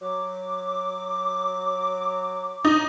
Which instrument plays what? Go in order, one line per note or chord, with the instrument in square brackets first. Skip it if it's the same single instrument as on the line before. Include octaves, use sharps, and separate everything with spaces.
[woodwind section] F#3 D6
[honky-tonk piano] D#4